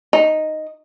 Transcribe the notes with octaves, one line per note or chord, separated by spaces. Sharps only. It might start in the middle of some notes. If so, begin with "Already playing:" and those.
D#4